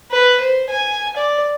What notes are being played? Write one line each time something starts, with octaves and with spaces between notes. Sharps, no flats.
B4
C5
G#5
D5